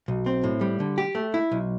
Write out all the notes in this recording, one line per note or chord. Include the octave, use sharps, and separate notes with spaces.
B1
C4
A2
G3
D3
G4
A3
E4
B1